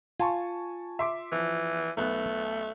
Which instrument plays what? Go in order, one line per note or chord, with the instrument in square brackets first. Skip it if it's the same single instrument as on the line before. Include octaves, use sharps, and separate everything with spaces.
[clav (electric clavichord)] F4 [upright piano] G#5 A5 C#6
[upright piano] E5 C6 D6
[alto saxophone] E3 [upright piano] F3
[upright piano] B1 B3 F#6 [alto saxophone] A3